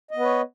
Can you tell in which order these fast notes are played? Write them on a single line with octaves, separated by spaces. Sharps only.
D#5 B3 B4 C#5